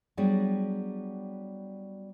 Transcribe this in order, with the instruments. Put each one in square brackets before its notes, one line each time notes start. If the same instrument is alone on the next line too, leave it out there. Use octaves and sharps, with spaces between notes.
[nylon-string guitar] F#3 G3 B3 D4 F#4 G#4